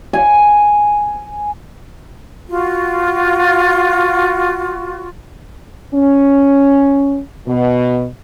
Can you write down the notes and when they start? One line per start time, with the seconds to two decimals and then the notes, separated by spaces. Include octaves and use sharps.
0.13 G#5
2.48 F4 F#4
5.93 C#4
7.46 B2